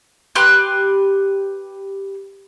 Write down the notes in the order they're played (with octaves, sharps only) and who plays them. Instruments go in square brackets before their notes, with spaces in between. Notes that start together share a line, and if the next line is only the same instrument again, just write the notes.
[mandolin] G4 B4 C6 F#6